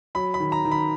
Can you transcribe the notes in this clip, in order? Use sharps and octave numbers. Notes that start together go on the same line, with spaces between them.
F#3 B5
B5
D#3
A#5
D#3
B5